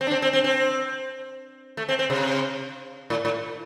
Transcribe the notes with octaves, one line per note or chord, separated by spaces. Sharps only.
C4
D4
C4
C4
C4
C4
A3
C4
C4
C3
A2
A2